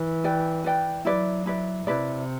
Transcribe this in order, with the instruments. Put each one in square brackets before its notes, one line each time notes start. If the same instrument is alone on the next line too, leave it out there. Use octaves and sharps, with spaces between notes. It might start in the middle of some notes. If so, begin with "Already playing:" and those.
Already playing: [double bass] E3
[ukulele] B4 D5 G5
B4 D5 G5
[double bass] F#3 [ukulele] E4 B4 D5
[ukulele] E4 B4 D5
[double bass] C3 [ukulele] E4 B4 D5